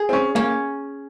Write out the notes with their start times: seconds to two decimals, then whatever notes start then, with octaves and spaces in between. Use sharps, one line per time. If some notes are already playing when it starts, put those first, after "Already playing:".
Already playing: G#4
0.09 C4
0.13 C#4
0.35 A#3 C#4